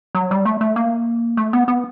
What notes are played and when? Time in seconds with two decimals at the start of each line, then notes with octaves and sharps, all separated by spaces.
0.15 F#3
0.31 G3
0.45 A3
0.61 A3
0.76 A#3
1.37 A3
1.53 B3
1.68 B3